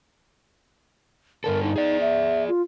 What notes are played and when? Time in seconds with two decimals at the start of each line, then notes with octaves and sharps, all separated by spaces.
1.44 G2 D3 A4 A#4
1.63 D#4
1.76 G#4 D5
2.01 E5
2.48 F4